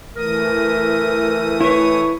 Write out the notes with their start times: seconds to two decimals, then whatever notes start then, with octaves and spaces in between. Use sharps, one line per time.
0.16 E3 A3 A#4 D#6
1.61 E4 B4 C#5